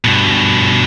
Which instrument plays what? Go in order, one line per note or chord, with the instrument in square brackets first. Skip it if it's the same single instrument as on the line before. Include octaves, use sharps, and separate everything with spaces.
[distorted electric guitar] G2 B2